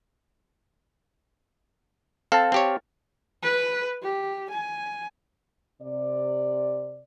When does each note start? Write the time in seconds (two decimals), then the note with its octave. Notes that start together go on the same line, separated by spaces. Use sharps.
2.32 C4 A4 F5 A5
2.52 C4 G4 C#5
3.42 B4
4.02 G4
4.50 G#5
5.81 C3 D5